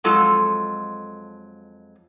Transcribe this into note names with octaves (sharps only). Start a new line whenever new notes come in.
F2 F#3 G#3 F4 A4